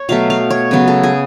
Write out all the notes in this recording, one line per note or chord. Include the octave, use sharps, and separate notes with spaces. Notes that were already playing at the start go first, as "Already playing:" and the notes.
Already playing: C#5
B2 F#3 A3 F5
F5
C#5
C#3 F#3 B3
A4
G#4